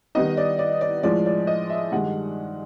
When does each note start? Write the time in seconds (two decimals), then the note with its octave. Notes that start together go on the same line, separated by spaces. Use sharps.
0.15 D#3 G3 B3 D#4 D#5
0.37 D5
0.59 D5
0.81 D5
1.03 A2 F3 G#3 D5
1.26 D5
1.47 D#5
1.70 E5
1.92 G2 D#3 G#3 F#5